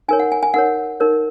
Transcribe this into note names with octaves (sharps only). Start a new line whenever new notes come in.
D#4 A#4 C#5 G#5
F#5
G#5
G#5
D#4 A#4 C#5 F#5
D#4 A#4 C#5